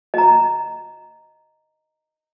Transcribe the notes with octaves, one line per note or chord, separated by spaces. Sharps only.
D#5 A#5